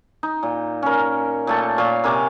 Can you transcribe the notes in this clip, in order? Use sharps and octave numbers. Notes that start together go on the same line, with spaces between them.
D#4
A#2
C#4 A#4
A#2 A3 A5
A#2 C#5 F5
C3 A#4 G#5 D6